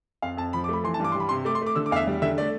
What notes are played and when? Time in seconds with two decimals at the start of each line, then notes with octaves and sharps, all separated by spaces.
0.22 F2 F5
0.37 F2 A5
0.53 F3 B5
0.64 D6
0.69 A3 B5
0.84 E3 C6
0.94 A5
0.99 G2
1.04 D6
1.12 G3 C6
1.20 B5
1.29 C3 C6
1.45 A3 D6
1.55 C6
1.61 A3
1.66 D6
1.76 D3 E6
1.86 D6
1.91 E2 F5
1.96 E5
2.07 G3
2.22 D3 E5
2.38 A3 D5